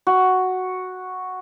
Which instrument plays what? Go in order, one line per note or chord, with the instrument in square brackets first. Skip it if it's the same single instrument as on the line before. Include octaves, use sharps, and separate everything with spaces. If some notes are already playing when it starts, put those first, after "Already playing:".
[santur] F#4